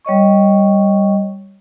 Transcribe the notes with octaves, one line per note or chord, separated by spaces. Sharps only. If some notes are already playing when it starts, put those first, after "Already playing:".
G3 C#5 D#5 C#6